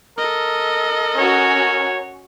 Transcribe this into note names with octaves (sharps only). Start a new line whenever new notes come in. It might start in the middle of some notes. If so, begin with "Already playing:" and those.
A4 A#4 D#5
C#4 F#4 C#5